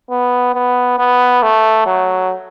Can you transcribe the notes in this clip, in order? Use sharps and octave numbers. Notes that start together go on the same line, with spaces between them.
B3
B3
B3
A3
F#3